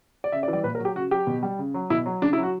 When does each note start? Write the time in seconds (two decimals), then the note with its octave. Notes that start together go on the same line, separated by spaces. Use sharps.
0.24 D5
0.32 C#3 E5
0.43 D5
0.48 E3
0.53 G3 D5
0.64 A#2 B4
0.75 A#4
0.79 F#3
0.85 G4
0.96 C#3 F#4
1.11 F#3 G4
1.27 B2
1.43 G3
1.59 C#3
1.74 F#3
1.90 B2 E4
2.06 F#3
2.22 C#3 D4
2.33 E4
2.38 F#3
2.43 F#4